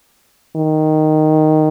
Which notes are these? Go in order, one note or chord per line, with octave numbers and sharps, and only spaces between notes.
D#3